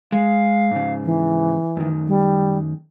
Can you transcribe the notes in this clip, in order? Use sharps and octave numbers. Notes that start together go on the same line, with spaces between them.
G#3 F5
G#2 C#3
E3
F#2 D#3
G3